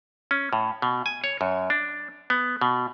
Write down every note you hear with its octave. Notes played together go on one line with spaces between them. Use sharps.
C#4
A2
B2
G#5
C#5
F#2
D4
B3
B2